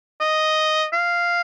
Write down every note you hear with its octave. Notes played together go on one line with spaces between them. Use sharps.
D#5
F5